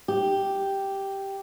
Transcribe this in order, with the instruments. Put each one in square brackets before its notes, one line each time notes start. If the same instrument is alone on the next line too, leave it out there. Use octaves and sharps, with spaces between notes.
[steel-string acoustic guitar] G4